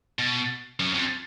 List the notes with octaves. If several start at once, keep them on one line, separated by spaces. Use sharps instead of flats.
B2
F#2
F2